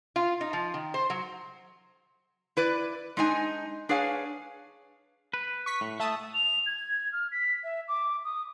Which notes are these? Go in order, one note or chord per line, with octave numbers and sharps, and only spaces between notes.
F4
D#4
F3
D#3
C5
F#3
E4 B4 D5
G#3 D4 D#4 G#5
D4 G#4 B4 C#5 F5 G#5
B4
C#6 B6
A2
A3 E5 A5 D#6
F7
G#6
F6
B6
E5
D6
D#6